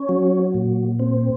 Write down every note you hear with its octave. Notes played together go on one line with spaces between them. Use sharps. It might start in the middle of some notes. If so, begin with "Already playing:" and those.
Already playing: C#4
F#3
A#2
C4